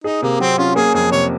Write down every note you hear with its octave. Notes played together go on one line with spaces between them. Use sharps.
D#4 G#4
C3 A#3
F#3 C4
C#4 F4
A#3 G#4
F2 G#4
C3 C#5